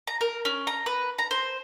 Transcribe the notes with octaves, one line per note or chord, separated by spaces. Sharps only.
A#5
A#4
C#4
A#5
B4
A#5
C5